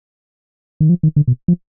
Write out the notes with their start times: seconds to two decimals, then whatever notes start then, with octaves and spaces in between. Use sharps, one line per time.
0.80 D#3
0.89 F3
1.03 D#3
1.16 D3
1.28 B2
1.48 F3